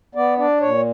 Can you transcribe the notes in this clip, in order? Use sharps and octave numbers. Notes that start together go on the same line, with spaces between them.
B3 D5
D4 D5
A#2 C#5